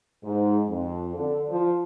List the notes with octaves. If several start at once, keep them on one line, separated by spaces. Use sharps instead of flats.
G#2
F2
D3
F3